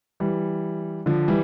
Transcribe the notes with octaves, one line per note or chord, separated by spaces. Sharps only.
E3 G3
D3 F3
E3 G3